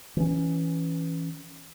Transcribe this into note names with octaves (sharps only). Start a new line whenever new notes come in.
E3 C#4